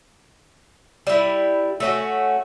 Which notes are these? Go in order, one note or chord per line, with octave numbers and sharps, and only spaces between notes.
G3 E4
A3 C#4 F#4